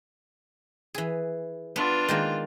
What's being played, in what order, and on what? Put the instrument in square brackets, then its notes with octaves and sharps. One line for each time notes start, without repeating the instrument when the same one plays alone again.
[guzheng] E3 G#4
[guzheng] B3 [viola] D4 F4
[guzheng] D#3 G#3 A#3